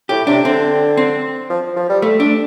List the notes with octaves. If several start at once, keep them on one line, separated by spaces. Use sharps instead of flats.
A2 G4
C3 D4
D3 C4
C4
F3
F3
G3
A3
D4